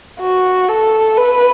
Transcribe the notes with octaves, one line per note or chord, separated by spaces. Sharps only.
F#4
A4
B4